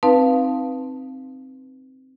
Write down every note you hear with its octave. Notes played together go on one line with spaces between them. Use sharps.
C4 D#4 B4 F5 A5